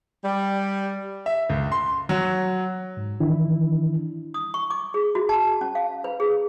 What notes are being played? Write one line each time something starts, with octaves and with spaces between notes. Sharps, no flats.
G3
E5
C#2
C6
F#3
G#2
D#3 E3 D4 E4
D#6
C#6
D6
G#4
F#4
A5
C#4
F5
B4
G#4